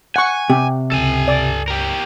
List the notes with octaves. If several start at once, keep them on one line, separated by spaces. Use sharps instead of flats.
F#5 G#5 C#6
C3 G4
C#2 G2 A4 G#5
D5
G4 A#4